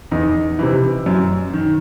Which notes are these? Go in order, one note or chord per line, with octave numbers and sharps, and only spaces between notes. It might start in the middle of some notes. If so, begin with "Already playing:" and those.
E2 D#4
C3 E3
F#2
D#3